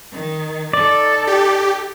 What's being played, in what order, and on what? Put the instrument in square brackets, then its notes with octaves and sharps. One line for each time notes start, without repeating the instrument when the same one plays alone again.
[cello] D#3
[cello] D#4 A4 [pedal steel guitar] D5
[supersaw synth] G4